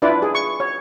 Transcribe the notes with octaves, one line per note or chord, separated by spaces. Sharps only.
D4 E4 F4 B4 D5
G#4
C#6
C#5